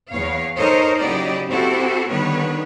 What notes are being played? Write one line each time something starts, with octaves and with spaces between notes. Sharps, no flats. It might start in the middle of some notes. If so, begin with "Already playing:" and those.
E2 C#5 F5
D#4 A4 A#4 C5 C#5 D#5
C#3 F#3 E4 G4 D5 D#5
C4 E4 F#4 G4 A4
D3 D#3 G3 B3 B4 C#5